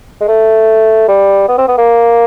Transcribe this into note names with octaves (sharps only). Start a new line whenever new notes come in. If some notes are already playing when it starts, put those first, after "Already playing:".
G#3
A3
G3
B3
C4
B3
A#3